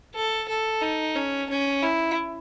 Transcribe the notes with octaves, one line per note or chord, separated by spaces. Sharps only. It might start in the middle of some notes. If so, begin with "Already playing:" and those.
A4
A4
D#4
C#4
C#4
E4